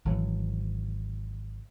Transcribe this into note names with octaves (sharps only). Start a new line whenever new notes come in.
G#1 C#3 E3 F#3